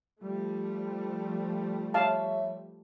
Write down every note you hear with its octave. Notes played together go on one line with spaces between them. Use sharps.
F3 G3 A3
C#5 E5 F5 A5